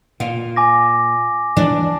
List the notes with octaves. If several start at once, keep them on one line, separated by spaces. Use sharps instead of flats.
A#2 F4
G#5 D6 A#6
E3 F3 G#3 D4